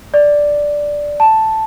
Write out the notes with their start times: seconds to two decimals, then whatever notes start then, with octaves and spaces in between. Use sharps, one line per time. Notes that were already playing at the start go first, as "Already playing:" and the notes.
0.14 D5
1.20 A5